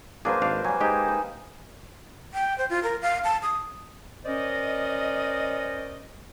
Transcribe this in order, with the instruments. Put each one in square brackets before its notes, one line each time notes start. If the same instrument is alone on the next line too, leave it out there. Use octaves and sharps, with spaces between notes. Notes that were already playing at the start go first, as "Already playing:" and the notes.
[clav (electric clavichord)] F#3 D4 G#4 [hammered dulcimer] A#3 B4 C5
[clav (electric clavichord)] G#1 D4 F5
[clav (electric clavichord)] F#3 G3 [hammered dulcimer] G#5
[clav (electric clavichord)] G#3 G4 [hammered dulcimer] D#4 C5
[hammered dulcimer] B4
[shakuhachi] G5
C5
F4
A#4
F5
A5
D#6
[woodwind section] C#4 A#4 C5 D5 D#5